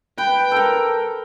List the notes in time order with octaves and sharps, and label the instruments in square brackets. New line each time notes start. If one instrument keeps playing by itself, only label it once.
[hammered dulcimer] B4 [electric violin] G5
[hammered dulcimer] A4 A#4